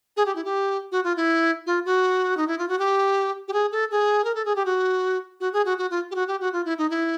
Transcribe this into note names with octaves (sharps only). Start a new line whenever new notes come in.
G#4
G4
E4
G4
F#4
F4
E4
F4
F#4
D#4
E4
F4
F#4
G4
G4
G#4
A4
G#4
A#4
A4
G#4
G4
F#4
F#4
G#4
F#4
F#4
F4
G4
F#4
G4
F#4
F4
E4
D#4
E4